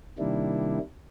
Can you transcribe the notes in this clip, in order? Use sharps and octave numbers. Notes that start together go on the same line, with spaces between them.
C3 D#3 G3 A#3 D4 E4